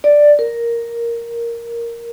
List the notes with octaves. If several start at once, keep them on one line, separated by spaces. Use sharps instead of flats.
D5
A#4